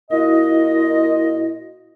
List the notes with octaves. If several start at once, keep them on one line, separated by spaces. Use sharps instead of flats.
A#2 E4 F#4 D#5